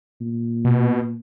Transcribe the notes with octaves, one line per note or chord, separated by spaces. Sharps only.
A#2
B2